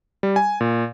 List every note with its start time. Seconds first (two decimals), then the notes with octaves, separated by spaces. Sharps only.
0.23 G3
0.36 G#5
0.61 A#2